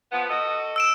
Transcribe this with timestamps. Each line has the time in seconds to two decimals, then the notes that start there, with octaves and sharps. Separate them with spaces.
0.12 F3 B3
0.30 F#4 A4 D#5
0.76 E6 D7 E7